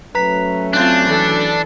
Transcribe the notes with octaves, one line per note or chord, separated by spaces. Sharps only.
F#3 A3 C#4 B4 A#5 B6
C4 D4 F4 F#6 G6
E3 A4